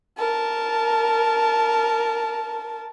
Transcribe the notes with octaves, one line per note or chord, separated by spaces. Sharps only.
A#4 A5